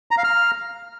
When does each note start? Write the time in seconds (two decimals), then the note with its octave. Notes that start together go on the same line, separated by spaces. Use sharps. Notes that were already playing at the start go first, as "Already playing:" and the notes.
0.11 A#5
0.18 F5
0.24 F6